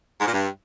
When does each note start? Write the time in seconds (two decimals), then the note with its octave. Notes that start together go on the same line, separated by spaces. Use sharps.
0.20 G#2
0.26 A#2
0.32 G2